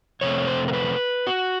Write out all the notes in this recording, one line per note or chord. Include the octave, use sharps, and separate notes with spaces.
F2 C3 A3 C4 C#5
C5
A#4
B4
F#4